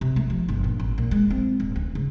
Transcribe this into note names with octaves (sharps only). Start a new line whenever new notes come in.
C3
A3
F3
G1
A#2
A1
A#2
G#3
C4
D1
D2
C#3